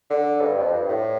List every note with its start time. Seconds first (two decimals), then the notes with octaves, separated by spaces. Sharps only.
0.10 D3
0.42 G2
0.57 F2
0.73 G2
0.89 A2